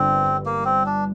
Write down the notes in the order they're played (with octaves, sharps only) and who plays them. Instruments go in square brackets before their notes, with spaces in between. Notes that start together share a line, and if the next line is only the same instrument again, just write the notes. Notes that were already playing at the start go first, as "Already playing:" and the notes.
Already playing: [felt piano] G1 G2 D3 [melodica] C4
[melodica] A#3
C4
D4